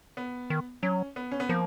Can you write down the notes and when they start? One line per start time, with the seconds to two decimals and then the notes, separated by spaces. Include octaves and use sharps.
0.17 B3
0.50 D#3
0.82 F#3 C#4
1.16 B3
1.31 C#4
1.40 B3
1.49 F3 A#3